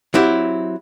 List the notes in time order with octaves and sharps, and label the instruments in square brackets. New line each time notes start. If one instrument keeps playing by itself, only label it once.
[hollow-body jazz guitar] F#3 C4 E4 G4